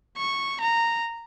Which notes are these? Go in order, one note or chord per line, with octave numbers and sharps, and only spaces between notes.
C#6
A#5